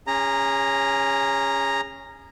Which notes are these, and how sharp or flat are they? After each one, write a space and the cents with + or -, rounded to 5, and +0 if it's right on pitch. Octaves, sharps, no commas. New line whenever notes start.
C#4 +0 G#4 -30 A#5 +0